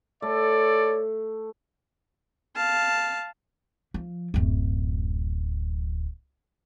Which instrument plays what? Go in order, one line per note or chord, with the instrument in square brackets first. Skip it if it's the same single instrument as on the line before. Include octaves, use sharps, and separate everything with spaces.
[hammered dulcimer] A3 [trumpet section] A4 C#5 D5
[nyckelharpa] F5 A5
[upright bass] F3
D1 F#2